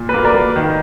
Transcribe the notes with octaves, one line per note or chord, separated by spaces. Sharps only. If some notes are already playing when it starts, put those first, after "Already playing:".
Already playing: A#2
B4
A#3
A#4 D5
A#3
D#3